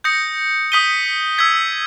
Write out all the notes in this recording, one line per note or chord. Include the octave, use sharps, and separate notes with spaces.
D#6 G6 A#6 C#7
D#6 G6 B6 D#7 G7
E6 G#6 B6